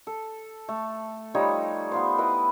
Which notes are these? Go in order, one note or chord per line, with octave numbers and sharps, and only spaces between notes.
A4
A3
F3 G3 D#4 C#5
B3 F4 C5
E4 B4 D#5